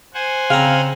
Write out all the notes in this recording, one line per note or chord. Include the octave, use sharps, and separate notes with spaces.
C5 F#5 G#5
C#3 C4 F5 A#5